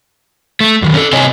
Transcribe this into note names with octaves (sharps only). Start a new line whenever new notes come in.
A3
F#2 D#3
C#4 A4
C3 C4 C#5 D#5 G#5